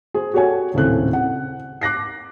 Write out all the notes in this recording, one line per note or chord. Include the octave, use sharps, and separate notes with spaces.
G#4 C5
F#4 G4 A4 C#5 F#5 G#5
D#1 A2 C#3 C4 A4 F#6
F#5
D6 F#6 A#6 C7